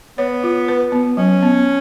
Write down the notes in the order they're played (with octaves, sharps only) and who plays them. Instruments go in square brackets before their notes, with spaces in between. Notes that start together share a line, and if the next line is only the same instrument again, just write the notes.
[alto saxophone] B3 [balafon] C#5
[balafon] F4
B4
B3
[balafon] F#3 [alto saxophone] C#4
[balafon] B3